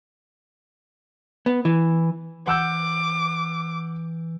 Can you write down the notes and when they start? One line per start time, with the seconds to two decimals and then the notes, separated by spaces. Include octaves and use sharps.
1.46 B3
1.65 E3
2.47 E3 F#5 D6 E6 G6